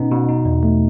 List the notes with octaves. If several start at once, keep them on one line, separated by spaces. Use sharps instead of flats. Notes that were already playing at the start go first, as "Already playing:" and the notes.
Already playing: B2 B3 C#4 D#4
B2
D#4
E2
A3